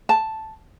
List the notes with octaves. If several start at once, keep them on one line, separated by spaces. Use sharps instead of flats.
A5